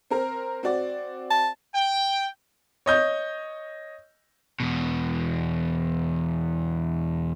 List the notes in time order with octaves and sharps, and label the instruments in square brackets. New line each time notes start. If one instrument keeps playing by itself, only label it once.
[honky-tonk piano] C4 A#4 C5
C4 F#4 D5
[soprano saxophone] A5
[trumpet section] G5
[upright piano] C#5 D#5 G6
[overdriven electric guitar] E2 B2